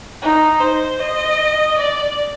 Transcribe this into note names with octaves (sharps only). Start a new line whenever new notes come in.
D#4
C5
D#5
D5